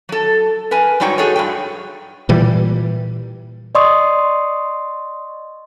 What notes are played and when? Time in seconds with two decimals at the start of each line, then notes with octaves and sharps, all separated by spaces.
0.09 F#3 A4
0.71 A#4 B4 G#5
1.00 G#2 F#3 G3 D#4 C#5 G5
1.18 D#4 F#4 G#4 A4 C#5
1.36 G2 F#3 G5
2.29 A#2 E3 G3
3.75 D5 D#5 C6 C#6 D#6